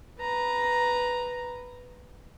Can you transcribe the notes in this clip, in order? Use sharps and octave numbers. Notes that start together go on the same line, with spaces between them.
B4 A#5